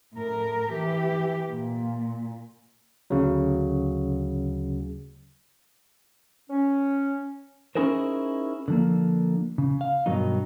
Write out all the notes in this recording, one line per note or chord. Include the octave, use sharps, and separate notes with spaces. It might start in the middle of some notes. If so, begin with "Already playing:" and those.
A2 A#4
E3 G4
A#2
D2 C#3 F#3
C#4
C#4 D#4 E4 G#4 A#4 C5
D3 F3 A#3
C#3
F5
G2 B2 D#3 F#3 D#4